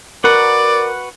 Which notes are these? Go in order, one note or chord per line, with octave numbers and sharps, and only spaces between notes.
F#4 A#4 B4 D5 F#5